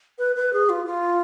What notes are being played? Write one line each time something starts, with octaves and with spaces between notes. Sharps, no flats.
B4
B4
G#4
F4
F4